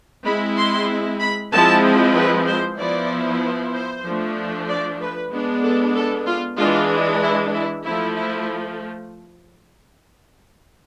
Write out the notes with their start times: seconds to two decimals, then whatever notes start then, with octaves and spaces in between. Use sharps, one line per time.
0.25 G#3 C4 E4 B5
0.57 C6
1.20 B5
1.52 F3 G#3 C4 E4 A5
2.15 B4
2.46 C5
2.78 F3 B3 E4 D5
3.73 C5
4.05 F3 A3 D4
4.69 D5
5.00 B4
5.32 G#3 B3 D4
5.63 A4
5.95 A4
6.26 F4
6.58 E3 G#3 D4 F4
7.22 E4
7.54 E4
7.84 F3 A3 E4
8.16 E4